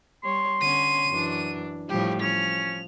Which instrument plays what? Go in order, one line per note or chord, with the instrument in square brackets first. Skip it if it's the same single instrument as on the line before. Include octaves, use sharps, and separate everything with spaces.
[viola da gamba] G3 C#5 [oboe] C6
[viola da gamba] D3 C#4 [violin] D#7
[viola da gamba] F#2 E3 D4
[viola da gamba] A2 F3 G3 [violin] G4
[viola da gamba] F3 [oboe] C#4 [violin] F7